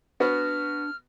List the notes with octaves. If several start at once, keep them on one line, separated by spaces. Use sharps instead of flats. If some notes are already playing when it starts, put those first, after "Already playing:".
B3 D4 F#4 F6